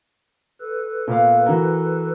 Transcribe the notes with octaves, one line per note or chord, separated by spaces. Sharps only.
A4 B4
A#2 B3 F5
E3 F#4 A#4